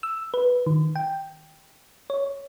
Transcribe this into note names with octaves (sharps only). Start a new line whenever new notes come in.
E6
B4
D#3
G5
C#5